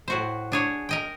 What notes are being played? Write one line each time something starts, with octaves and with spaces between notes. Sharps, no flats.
A2 F#4 C5
D4 G#4 C#5
A#4 D#5 G5